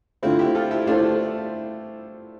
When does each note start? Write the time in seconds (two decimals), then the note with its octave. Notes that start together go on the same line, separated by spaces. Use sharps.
0.22 D3 A3 C4 D4 E4 F4 C5
0.39 E4 G4
0.55 F4 A4
0.71 E4 G4
0.87 A3 D4 E4 F4 A4 C5